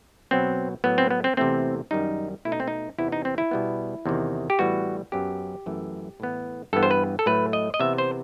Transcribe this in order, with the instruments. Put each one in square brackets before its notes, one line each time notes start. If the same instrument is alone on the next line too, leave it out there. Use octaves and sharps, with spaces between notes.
[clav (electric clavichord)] B2 F#3 B3 C4
A2 F#3 B3
C4
B3
C4
E2 C3 E3 A3 C4
F#2 D#3 G3 D#4
B2 A3 E4
D#4
C4
D#4
E2 C3 E3 B3 E4
D#4
C4
E4
B2 G3 B3
E2 C3 D#3
G4
A2 E3 G3 B3 F#4
F#2 F#3 B3 G4
F#2 E3 A3
A2 E3 B3
G2 E3 B3 A4
C5
B4
A4
A2 F#3 A3 B4
D#5
D#5
C3 E3 B3 E5
C5